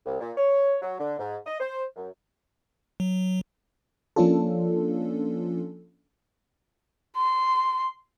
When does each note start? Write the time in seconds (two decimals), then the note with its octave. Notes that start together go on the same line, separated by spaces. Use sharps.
0.06 C2
0.20 A#2
0.38 C#5
0.82 F#3
1.00 D3
1.19 G#2
1.46 D#5
1.60 C5
1.96 F#2
3.00 F#3
4.16 F3 A#3 C#4 D4 F4 A4
7.17 C6